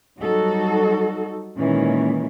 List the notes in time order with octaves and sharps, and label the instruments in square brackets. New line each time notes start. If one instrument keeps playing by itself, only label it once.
[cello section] F#3 G3 D#4 F#4 A4
A#2 D#3 E3 G#3 C#4